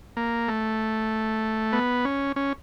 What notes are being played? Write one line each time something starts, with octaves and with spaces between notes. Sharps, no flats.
A#3
A3
B3
C#4
C#4